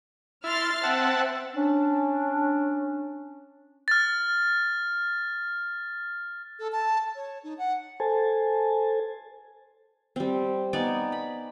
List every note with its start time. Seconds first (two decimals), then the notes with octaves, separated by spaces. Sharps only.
0.44 E4 C6 F6 A6
0.83 C4 E5 F#5 A5
1.55 C#4 D4
3.88 F6 A6
6.59 A4
6.72 A5
7.15 C#5
7.44 D#4
7.58 F#5
8.00 A4 C5 G#5 A5
10.16 G3 C4
10.73 B3 D#4 D5 G#5
11.12 B5